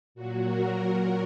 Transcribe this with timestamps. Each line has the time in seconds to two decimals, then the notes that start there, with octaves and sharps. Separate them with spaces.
0.15 A#2 F#3 F#4
0.44 A#4